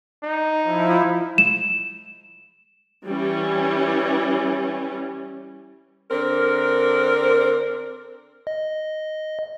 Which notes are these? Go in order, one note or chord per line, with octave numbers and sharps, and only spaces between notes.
D#4
F3 E4
E7
E3 G3 C#4
D3 C4 D4 A#4
D#5